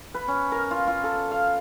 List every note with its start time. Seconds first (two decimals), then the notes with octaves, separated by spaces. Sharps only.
0.14 B4
0.28 C#4
0.52 A#4
0.71 F4
0.87 F4
1.04 A4
1.31 F5